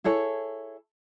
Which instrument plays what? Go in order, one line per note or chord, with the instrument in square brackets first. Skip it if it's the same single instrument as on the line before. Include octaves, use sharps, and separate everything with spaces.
[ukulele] E4 G#4 A4 C#5